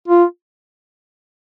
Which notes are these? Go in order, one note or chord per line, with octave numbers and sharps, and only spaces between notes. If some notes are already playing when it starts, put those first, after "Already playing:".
F4